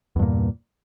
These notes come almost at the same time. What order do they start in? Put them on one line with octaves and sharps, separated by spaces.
E2 G2 A#2